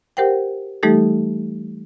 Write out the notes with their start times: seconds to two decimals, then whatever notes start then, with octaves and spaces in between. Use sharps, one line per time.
0.17 G4 A#4 C5 F#5 G5
0.83 E3 G3 A3 D#4 G4 A4